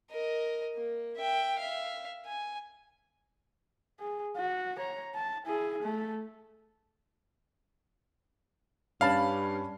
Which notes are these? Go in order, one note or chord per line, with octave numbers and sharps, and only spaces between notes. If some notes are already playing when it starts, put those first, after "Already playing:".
A#4 D#5
A#3
E5 G5
E5 F5
G#5
G#4
F#4
C#5 A#5
A5
E4 G#4
A3
G2 C#4 D5 F5 A5 B5